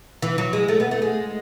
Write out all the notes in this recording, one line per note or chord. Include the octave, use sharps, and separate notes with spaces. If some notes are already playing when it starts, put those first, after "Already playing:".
E3
F#3
G#3
A3
B3
A3
G#3